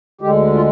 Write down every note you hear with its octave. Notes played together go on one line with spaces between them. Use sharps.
D2 D3 G#3 G4
F4